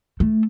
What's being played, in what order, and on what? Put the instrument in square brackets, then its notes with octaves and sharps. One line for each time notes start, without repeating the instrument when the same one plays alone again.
[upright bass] A3